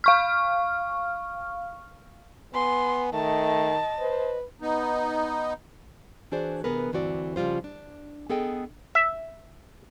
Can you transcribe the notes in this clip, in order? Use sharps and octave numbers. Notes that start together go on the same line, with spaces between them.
F5 C#6 F6
B3 G#5 C6
D#3 A3 D#5 A5
B4 C5
B3 D#4
E3 D4 F#4 G#4 C5 D5
C3 E3 B3 G#4 A#4 B4
D2 G2 E3 C4 F#4 D5
C#3 F3 G3 F4 C5
D4
B3 G#4 A4 D#5 G5
E5